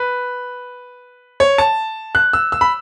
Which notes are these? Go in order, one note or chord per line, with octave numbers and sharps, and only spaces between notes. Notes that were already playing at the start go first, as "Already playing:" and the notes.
Already playing: B4
C#5
A5
F#6
E6
E6
B5